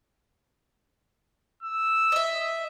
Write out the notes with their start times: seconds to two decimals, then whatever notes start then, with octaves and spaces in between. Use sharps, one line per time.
1.63 E6
2.12 D#5 E5